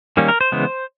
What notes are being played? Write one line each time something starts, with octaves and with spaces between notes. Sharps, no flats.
D#3 G3 A#3 C#4
A#4
C5
C#3 E3 G#3 B3